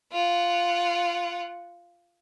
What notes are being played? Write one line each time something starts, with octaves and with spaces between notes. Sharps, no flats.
F4 F#5